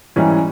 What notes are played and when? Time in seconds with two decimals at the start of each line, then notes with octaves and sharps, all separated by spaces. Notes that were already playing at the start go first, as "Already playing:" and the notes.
0.16 G#2 E3 G3 C#4